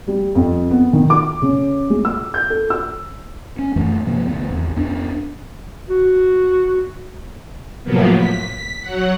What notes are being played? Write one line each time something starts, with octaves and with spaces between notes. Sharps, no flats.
G3
F2
B3
D#3
D6
C#3
G#3
E6
G6
A4
E6
C#4
F#2 E3 A3
G2 C3 F3 A#3
D2 B3 C4
G#1 E2
F2 B3 C#4 D4
F#4
A2 C3 F3 F#3 A#3 B3
B6
F#3 F#5